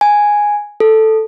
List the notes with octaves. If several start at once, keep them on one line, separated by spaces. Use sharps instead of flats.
G#5
A4